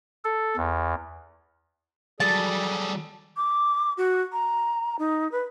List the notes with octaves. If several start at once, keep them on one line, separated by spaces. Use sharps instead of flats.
A4
E2
F#3 G3 G#4 A4 D5 A5
D6
F#4
A#5
D#4
B4